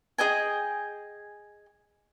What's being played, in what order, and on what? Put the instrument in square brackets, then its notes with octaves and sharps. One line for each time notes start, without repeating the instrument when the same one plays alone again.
[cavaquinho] G#4 D#5 G5 G#5